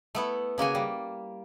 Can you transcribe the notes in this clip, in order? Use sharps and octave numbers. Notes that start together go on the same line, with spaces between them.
A3 B3 E4
C#3 A#3 F#4 G#5
G3